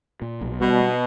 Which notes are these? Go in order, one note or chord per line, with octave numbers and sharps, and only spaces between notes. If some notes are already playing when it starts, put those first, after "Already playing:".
A#2
B1
B2 G3
B3